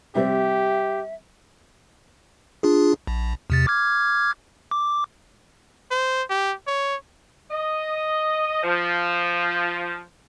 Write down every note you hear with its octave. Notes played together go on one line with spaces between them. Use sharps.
C3 G3 C4 G4 E5
D4 F4 G#4
A#1
E2 C3 A6
D6 F6 G#6
D6
C5
G4
C#5
D#5
F3